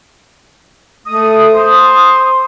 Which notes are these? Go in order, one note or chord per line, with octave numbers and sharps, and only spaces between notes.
A3 D#6
C5 D#6